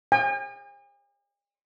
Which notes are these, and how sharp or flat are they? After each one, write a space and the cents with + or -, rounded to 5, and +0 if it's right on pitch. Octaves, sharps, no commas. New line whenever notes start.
G#5 -45